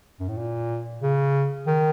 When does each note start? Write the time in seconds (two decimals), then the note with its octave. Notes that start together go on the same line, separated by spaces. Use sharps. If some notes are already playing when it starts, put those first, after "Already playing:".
0.20 F#2
0.28 A2
0.37 A#2
1.02 C#3
1.67 D#3